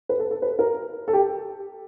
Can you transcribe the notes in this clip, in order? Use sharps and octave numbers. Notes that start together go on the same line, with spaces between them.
B4
A4
A4
B4
A#4
A4
G4